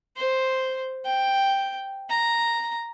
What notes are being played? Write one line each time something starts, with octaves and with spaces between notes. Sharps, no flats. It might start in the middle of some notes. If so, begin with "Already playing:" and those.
C5
G5
A#5